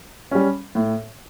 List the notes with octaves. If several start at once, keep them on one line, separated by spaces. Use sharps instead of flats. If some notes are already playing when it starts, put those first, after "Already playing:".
G3 C#4
A2